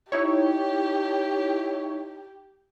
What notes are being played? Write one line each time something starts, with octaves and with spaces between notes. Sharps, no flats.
D#4 E4 G4 C#5